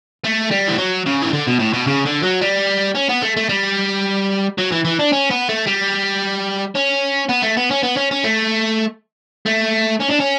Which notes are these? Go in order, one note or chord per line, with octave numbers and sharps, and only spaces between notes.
A3
G3
E3
F#3
C#3
E3
D3
B2
A2
B2
C#3
D3
F#3
G3
C#4
B3
A3
A3
G3
F#3
E3
E3
D4
C#4
B3
A3
G3
C#4
B3
A3
B3
C#4
B3
C#4
C#4
A3
A3
C#4
D4
C#4